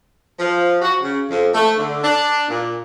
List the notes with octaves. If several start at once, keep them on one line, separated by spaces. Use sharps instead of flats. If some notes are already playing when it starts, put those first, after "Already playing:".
F3
F#4
C#3
F2
A3
D3
D4
A#2